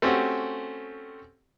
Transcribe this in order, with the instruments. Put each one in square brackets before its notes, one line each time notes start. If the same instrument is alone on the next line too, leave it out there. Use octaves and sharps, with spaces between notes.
[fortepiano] A3 C4 C#4 F#4 G4